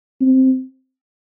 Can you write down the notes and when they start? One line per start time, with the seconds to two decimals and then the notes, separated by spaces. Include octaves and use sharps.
0.21 C4